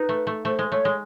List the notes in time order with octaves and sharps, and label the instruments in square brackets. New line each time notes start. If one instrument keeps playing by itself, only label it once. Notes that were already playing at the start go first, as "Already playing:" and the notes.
Already playing: [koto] D#4 [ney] B4
[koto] A3
A3
[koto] A3 [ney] C5
[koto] G#3
[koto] A3 [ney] C#5
[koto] G#3